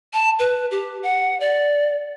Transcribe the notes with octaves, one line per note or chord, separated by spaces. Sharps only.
A5
B4
G4
F#5
D5